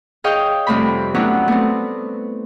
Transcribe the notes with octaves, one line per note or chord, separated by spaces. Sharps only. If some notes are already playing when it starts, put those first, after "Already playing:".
G#4 C#5 D#5 F5 G5
F2 C3 G3 A3 D5 B5
F#3 A3 B3 C#4 D4 E4
A3 B3 C4